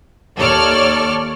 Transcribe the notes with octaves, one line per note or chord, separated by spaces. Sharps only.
D#2 A4 C#5 D5 F6